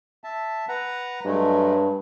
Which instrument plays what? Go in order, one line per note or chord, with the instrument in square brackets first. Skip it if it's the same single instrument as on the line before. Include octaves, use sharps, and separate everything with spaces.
[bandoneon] E5 A5
B4 F#5 A#5
[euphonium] G2 [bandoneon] F#3 G#3 A3